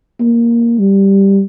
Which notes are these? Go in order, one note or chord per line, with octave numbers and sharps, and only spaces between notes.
A#3
G3